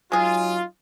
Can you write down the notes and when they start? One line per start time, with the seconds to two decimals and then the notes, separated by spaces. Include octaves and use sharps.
0.12 F#3 G#3 D#4 F4 G#4